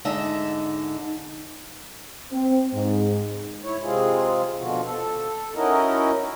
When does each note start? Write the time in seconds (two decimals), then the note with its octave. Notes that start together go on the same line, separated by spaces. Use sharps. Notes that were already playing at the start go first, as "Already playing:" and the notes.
0.05 G#2 D3 D#4 D#5 E5 A5
2.32 C4
2.74 G#2
3.64 E4 C#5
3.82 C3 G#3 C4 F4 G#4
4.59 B2 D3 F3 F4 F#4
4.84 A4
5.56 C#4 D#4 E4 F#4 A#4 D#5